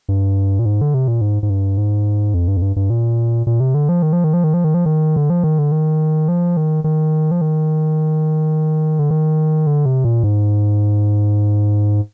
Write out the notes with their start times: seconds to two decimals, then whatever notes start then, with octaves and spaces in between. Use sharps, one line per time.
0.09 G2
0.59 A#2
0.65 G#2
0.81 D3
0.94 C3
1.08 A#2
1.21 G#2
1.43 G#2
1.50 G2
1.78 G#2
2.34 F2
2.48 G2
2.57 F2
2.62 G2
2.76 G2
2.90 A#2
3.47 A#2
3.60 C3
3.74 D3
3.89 F3
4.02 D#3
4.13 F3
4.24 D#3
4.34 F3
4.44 D#3
4.54 F3
4.64 D#3
4.74 F3
4.86 D#3
5.16 D3
5.30 F3
5.43 D#3
5.59 D3
5.72 D#3
6.28 F3
6.57 D#3
6.84 D#3
7.31 F3
7.41 D#3
8.99 D3
9.10 D#3
9.67 D3
9.86 C3
10.04 A#2
10.23 G#2